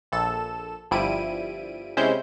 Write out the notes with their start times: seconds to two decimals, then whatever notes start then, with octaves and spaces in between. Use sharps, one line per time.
0.12 A#1 A4 E7
0.91 G1 F3 G3 E4 D7 D#7
1.97 C3 G#3 C#4 E4 C5 G6